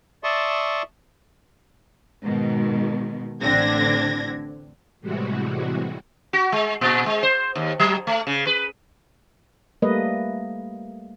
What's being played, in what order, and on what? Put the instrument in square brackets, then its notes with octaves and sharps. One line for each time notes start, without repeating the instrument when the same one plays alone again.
[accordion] D5 E5 A5 C6 C#6 D#6
[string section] G#2 B2 D#3
A1 D3 C4 D4 G#6 A#6
[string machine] A2 C3 E3 G3 G#3 F#4
[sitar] F#4
G#3
A#2
G#3
C5
D#2
F#3
A3
C#3
B4
[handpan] G3 A3 A#3 B4 D#5